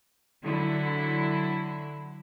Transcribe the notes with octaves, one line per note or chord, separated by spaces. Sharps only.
D3 F#3 E4